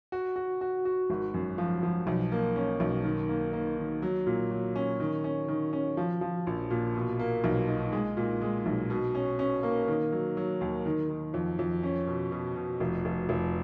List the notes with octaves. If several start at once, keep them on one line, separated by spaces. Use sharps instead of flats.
F#4
F#4
F#4
F#4
G#1
F#2
F3
F3
B1
A#3
C#4
B1
D#3
A#3
A#3
D#3
F#3
A#2
F#3
C#4
D#3
C#4
D#3
C#4
F3
F3
A#1
A#2
B2
A#3
B1
D#4
G#3
A#2
G#3
B1
B2
C#4
C#4
A#3
D#3
F#3
F#3
D#2
D#3
D#3
F2
F2
C#4
B2
B2
B2
F1
F1
F1